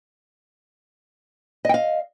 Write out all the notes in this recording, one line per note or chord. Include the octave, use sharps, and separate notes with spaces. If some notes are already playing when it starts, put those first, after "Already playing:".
D#5 F5 G5